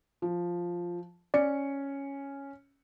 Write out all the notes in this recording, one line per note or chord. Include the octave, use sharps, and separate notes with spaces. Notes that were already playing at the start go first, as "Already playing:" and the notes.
F3
C#4 D5 C#7